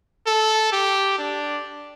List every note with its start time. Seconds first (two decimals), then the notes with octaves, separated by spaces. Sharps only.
0.27 A4
0.73 G4
1.18 D4